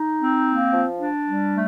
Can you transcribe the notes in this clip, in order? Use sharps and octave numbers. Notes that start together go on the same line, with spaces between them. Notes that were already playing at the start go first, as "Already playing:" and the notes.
Already playing: D#4
C4
A#3
F3
D4
G3
A3